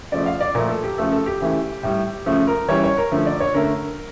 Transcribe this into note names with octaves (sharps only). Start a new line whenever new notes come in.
C#3 F3 A3 D5
F5
D5
A#2 F3 A3 A#4
A4
G4
C#3 F3 A3 A4
A4
G4
C#3 E3 A3
A2 G3
C#3 F3 A3
A#4
C#3 E3 G3 C#5
C#5
A#4
D3 F3 A3
D5
C#5
D3 A3 A#4